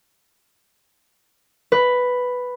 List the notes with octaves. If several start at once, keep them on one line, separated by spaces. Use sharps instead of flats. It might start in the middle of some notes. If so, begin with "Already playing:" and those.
B4